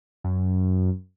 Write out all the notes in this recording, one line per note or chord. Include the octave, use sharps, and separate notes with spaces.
F#2